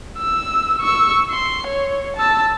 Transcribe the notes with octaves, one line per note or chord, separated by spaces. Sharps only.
E6
C#6 E6
C6
C#5
A5 E6